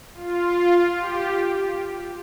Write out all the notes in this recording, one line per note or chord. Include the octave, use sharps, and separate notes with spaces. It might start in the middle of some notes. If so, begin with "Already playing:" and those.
F4
G4